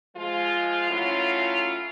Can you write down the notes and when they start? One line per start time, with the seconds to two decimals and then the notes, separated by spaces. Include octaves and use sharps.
0.16 F3 G#3 F4
0.89 F#3 A3 C#4 E4 F4